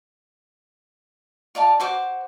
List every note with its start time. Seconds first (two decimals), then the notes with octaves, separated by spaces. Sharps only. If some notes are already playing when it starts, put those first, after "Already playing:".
1.55 F4 D5 F5 A5
1.80 F#4 C5 D6